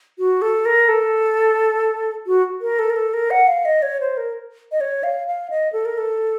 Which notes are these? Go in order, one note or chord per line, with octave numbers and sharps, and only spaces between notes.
F#4
A4
A#4
A4
F#4
A#4
A4
A#4
A4
A#4
F#5
F5
D#5
C#5
C5
A#4
D#5
C#5
F5
F5
D#5
A4
A#4
A4